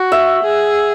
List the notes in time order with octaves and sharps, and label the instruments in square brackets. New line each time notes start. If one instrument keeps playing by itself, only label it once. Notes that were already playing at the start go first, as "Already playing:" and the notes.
Already playing: [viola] F#4 [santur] F#5
[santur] E5
[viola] G#4